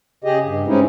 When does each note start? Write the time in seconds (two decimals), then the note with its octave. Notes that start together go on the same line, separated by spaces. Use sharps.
0.24 C#3 G4 G#4 D#5
0.44 G2
0.67 G#3 C4 C#4 D#4 E4